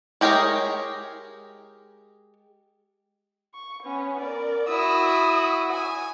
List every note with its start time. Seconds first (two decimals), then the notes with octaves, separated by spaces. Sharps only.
0.21 G#3 G4 G#4 A#4 C#5
3.54 C#6
3.83 B3 C#4
4.21 A#4 D5
4.69 E4 F#4 D#6 E6
5.73 G#5